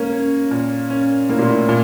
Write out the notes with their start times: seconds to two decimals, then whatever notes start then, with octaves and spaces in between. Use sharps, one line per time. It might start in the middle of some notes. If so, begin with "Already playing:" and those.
Already playing: G#2 A#3 C#4
0.13 C#4
0.51 A#2
0.90 C#4
1.29 A2 A#3
1.39 A#2
1.48 A2
1.69 A#2